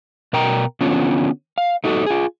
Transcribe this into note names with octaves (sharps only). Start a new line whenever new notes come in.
B2 A#4 G5 A#5
D3 B3 C#4 F4
F5
A3 D#4 F#4 A4
F4 G#4